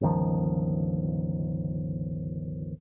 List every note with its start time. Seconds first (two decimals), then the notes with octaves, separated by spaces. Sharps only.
0.01 G1 C#2 D#3 F3